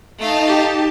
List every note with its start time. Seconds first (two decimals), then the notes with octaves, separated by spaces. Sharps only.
0.18 A3 D#4 F5 A5
0.47 G4